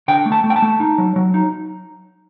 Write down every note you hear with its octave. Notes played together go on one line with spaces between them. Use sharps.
D3 G5
A3
A5
A3
G5
A5
A3
D#4
F#3
F#3
D#4